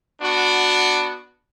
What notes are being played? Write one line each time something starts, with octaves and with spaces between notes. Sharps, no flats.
B3 D4 F#4